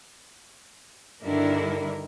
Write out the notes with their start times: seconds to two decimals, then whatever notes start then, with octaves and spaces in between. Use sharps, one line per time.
1.24 G2 D3 D#3 D4 E4 A#4